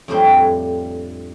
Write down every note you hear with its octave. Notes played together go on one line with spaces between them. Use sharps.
F2 A2 G3 D4 C5 G5